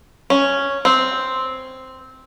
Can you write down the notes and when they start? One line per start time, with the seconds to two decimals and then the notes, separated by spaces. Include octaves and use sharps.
0.30 C#4
0.85 C4